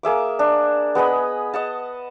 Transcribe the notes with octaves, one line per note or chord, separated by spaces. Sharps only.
A#3 G#4 E5 D6
D4
B3 G#4 D#5 B5
D#5 F#5 A5